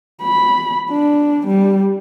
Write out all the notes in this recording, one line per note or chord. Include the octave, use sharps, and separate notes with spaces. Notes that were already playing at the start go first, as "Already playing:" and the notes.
B5
D4
G3